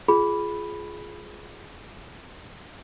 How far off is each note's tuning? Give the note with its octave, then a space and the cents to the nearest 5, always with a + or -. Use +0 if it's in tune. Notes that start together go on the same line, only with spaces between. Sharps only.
F4 +0 G#4 +15 B5 +0